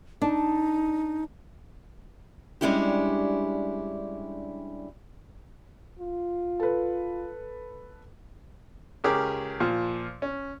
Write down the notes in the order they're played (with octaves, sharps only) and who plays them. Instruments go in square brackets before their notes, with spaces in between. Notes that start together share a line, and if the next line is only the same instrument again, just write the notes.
[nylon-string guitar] D4 [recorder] D#4
[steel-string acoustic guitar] G3 G#3 C#4 D4 E4 G4
[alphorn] F4
[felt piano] A4 B4
[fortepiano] C#2 C#4 G4 G#4 A#4 D6
A#2 F3
C#4